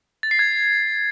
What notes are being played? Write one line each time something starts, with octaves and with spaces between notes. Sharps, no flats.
A6
C7
G#6